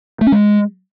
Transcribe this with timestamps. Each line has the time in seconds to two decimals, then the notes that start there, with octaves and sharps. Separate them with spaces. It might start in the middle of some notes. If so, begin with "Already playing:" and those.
0.21 A3
0.27 C#4
0.32 G#3